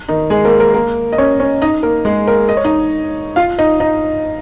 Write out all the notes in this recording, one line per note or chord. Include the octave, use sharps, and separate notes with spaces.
D#3 D#4
G#3 G#4
A#3 A#4
A#3 A#4
A#3 A#4
D#5
C#4 C#5
C#4 C#5
D#4 D#5
A#3 A#4
G#3 G#4
A#3 A#4
D#5
C#5
D#4 D#5
F4 F5
D#4 D#5
D#4 D#5